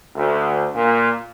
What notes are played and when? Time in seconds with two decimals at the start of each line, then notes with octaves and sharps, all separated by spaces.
0.16 D2
0.74 A#2